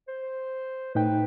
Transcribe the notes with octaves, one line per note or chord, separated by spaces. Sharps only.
C5
A2 D#4 B4 G5